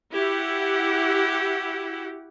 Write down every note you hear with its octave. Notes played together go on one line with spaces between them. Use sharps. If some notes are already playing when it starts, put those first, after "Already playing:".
E4 F#4 G4 F#5